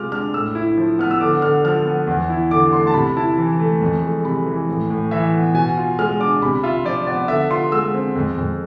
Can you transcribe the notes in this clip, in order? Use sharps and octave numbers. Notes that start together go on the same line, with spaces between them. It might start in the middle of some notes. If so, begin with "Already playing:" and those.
Already playing: C3 G#3 F4 D6 F6
D4 F6
A2 E6
E4
F3
B3 F6
E6
D3 D6
D3 F6
F3 F6
B3
E2
E4
D3 D6
A3 C6
A5
C3 B5
E4 A5
E3
A3
F2
G#3
C3 B5
E3
A2
A2
E3 E5
B3
B2 G#5
F4
G#3 F6
D4 D6
C3 B5
F4 E5
F3 D5
B3 D5
D3 E5
F4 C6
G#3 E6
C4
F2
F2